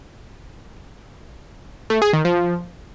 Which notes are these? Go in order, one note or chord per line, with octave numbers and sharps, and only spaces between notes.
A3
G#4
D#3
F3